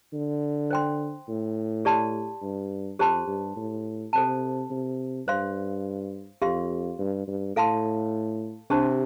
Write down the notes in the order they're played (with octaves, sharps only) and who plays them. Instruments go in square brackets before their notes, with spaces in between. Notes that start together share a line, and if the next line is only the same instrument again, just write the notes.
[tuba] D3
[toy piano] C5 G5 C6
[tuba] A2
[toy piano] G4 D5 A5 C6
[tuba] G2
[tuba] F2 [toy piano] G4 C5 A5 C6
[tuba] G2
A2
[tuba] C3 [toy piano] A4 C5 A5
[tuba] C3
[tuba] G2 [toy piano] C5 F5 C6
[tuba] F2 [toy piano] G4 F5 C6
[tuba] G2
G2
[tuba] A2 [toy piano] A4 F5 A5 C6
[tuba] C3 [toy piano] D4 G4 C5 A5 C6